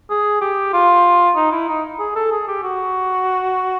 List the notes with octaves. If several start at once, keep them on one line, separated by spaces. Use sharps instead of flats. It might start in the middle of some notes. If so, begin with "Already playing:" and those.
G#4
G4
F4
D#4
E4
D#4
G#4
A4
G#4
G4
F#4